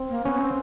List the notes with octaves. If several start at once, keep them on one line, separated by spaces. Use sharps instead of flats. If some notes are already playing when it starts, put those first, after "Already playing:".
Already playing: C4
A#3
B3 C#4
C4